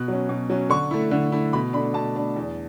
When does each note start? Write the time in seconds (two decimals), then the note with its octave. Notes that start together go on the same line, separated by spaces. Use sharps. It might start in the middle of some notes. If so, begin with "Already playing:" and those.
Already playing: B2 F#6
0.08 F#3 C#4
0.29 B2
0.50 F#3 C#4
0.70 D3 C#6
0.91 A3 E4
1.11 D3
1.32 A3 E4
1.53 B2 B5
1.73 A3 D4 B5
1.94 B2 A5
2.15 A3 D4
2.36 E2